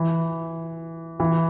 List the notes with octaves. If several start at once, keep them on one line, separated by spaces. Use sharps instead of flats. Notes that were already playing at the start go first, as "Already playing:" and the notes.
Already playing: E3
E3